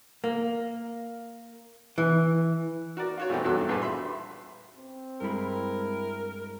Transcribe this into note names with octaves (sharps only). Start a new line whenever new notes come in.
A#3
E3
F#4 A#4 D5
F4 F#4 C#5
G#2 B2 E3 G3 A3 C4
E2 G2 F#3 F#4 A4 E6
A#1 G2 A#3 G#4 B4 A5
E5 B5 C6
C4
G2 G#3 E4 A#4 B5